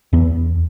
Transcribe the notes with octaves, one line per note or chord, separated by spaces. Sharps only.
E2 B3